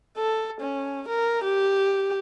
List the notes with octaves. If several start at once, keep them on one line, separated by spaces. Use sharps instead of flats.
A4
C#4
A#4
G4